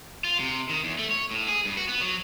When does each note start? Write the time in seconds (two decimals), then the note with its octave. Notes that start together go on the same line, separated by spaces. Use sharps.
0.24 F4
0.40 C3
0.69 D#3
0.84 E2
0.99 A3
1.11 C#5
1.31 A2
1.49 G#4
1.65 G2
1.77 F#4
1.88 B3
2.01 F#3